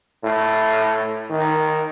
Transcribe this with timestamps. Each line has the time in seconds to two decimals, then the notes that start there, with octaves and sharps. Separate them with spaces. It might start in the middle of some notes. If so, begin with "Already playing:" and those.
0.24 A2
1.30 D#3